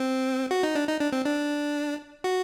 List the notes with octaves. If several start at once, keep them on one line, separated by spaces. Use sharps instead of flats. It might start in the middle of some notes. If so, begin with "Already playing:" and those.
Already playing: C4
F#4
D#4
D4
D#4
D4
C4
D4
F#4